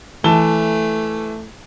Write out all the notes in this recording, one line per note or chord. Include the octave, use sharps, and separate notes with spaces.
E3 A3 A5 G7